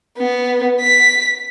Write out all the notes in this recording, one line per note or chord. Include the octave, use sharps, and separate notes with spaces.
B3
B6